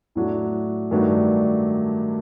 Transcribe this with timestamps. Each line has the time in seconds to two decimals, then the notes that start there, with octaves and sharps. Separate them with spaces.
0.15 A2 F#3 A3 D4
0.91 G2 D#3 F#3 A3 D4